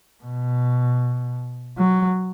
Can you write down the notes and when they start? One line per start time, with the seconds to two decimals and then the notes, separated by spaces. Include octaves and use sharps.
0.24 B2
1.78 F#3